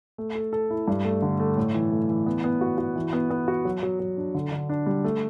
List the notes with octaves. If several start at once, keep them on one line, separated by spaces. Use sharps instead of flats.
A3
A4
A4
E4
G2
A3
D3
A3
A2
E3
A3
E3
B3
B3
F#4
F#4
E3
B3
B3
F#4
F#3
F#3
F#3
D4
D3
D3
D4
G3
A3